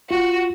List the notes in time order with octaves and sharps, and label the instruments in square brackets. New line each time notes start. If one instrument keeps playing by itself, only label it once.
[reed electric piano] F4 [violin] F#4